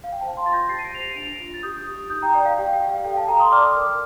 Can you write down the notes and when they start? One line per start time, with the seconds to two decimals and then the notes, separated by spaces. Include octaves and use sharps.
0.04 F5
0.12 G5
0.21 C5 F5 A5
0.37 A5 C6
0.45 F4 A6
0.52 G6 A#6
0.69 G4 A6 C7
0.79 D#7
0.84 A#6 D7
0.93 C5 F7
1.00 C7 D#7
1.15 D4 D7 F7
1.40 F4
1.54 A6
1.63 G4 D#6 G6
1.87 G4
2.10 D#4 D#6 G6
2.22 G5 A#5
2.34 D5 G5
2.45 F5
2.58 G4 G5
2.73 G5
2.81 G4
2.89 F5
3.05 A4 G5
3.16 F5 A5
3.28 A4 G5 A#5
3.40 C6 D#6
3.52 D5 D6 F6
3.76 A#4